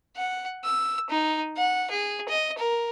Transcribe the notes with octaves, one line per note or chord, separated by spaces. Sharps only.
F#5
E6
D#4
F#5
G#4
D#5
A#4